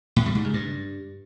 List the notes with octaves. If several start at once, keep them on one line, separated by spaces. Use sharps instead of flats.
A2
G3
G#2
C#3
G2